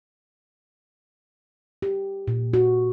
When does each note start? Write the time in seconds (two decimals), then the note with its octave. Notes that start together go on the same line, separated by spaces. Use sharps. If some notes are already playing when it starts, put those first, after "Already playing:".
1.82 G4
2.28 A#2
2.53 F#4